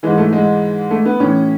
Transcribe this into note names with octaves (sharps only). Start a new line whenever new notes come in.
G#2 E3 G#3
A3
G#3
A3
B3
A2 E3 C#4